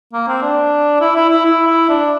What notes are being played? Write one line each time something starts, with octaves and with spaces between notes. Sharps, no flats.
A#3
C4
D4
E4
E4
E4
E4
E4
D4